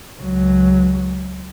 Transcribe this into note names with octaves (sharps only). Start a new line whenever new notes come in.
C#2 F#3